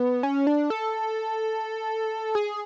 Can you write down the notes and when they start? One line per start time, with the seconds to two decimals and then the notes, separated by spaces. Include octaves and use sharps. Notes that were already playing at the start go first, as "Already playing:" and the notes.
Already playing: B3
0.23 C#4
0.47 D4
0.70 A4
2.35 G#4